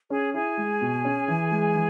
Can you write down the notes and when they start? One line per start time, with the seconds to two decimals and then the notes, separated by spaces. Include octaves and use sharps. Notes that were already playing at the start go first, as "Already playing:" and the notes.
0.10 C#4 G#4 G#5
0.33 E4 G#4 G#5
0.57 G#3
0.81 B2
1.05 C#4
1.28 E3
1.51 G#3
1.75 E3